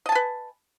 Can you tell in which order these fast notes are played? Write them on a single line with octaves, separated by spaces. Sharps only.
D#5 A5 G#5 B4